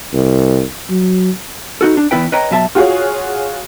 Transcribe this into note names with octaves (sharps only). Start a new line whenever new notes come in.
C2
F#3
D#4 F#4 A4
D4
E2 B3 E4 B4 G5
B4 C#5 D#5 G5 A#5
B2 F#3 E5 A5
F4 F#4 G#4 C#5